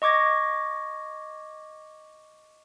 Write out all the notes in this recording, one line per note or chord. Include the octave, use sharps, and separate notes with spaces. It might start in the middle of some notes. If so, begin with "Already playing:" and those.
D#5 C#6 D6 G#6 A#6